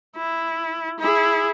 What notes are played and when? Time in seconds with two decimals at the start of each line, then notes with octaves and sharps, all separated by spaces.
0.16 E4
0.99 E4 G#4